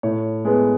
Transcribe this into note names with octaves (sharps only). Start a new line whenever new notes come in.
A2 C#5
G#3 B3